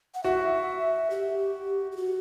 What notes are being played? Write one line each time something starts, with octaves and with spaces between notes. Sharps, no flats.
F#5
F#4 E5
G4
G4
F#4